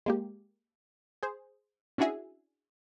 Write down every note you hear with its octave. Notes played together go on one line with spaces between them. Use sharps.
G#3 A#3 G4
G#4 C5
C#4 D4 E4 F#4 G#4 E5